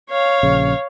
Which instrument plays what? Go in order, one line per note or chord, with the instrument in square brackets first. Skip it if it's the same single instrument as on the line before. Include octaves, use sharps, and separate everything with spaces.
[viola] C#5 F5
[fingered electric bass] A#1 C#3